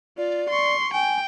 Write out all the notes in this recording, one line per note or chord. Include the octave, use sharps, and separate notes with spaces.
F4 D5
C6 C#6
G5 G#5